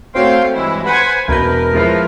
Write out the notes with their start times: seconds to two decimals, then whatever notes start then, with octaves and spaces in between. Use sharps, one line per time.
0.15 A3 C4 F#4 C#5 F5 G5 C6
0.55 G2 E3 G#3 E4
0.86 B4 C5 F#5 G#5 B5
1.28 E1 A#4 B4 G6
1.73 F3 G#3 E4 F4 B4